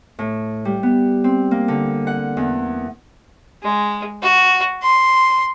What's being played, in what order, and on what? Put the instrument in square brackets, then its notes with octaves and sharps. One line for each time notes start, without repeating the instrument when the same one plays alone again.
[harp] A2
G3
B3
C4
A#3
D3
F#5
E2
[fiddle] G#3
F#4
C6